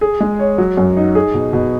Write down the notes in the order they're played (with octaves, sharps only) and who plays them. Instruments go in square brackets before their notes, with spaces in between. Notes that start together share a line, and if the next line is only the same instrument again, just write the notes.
[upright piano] G#4
G#3
C#5
F#3
F#2
D#4
G#4
B2
B2